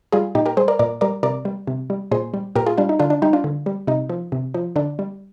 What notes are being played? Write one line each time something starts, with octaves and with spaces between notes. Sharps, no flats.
G3 F4 G#4
A#2 D#4 G4
G4 A#4
G3 G#4 C5
A#4 D5
A#2 A#4 D5
G3 A#4 D5
C3 A#4 D5
G3
C3
G3
A#2 G#4 C5
G3
A#2 G4 A#4
F4 G#4
G3 D4 F4
D#4
D3 D4 F4
D4
G3 D#4 G4
D4 F4
D3
G3
C3 D#4
F3
C3
F3
D3 D4
G3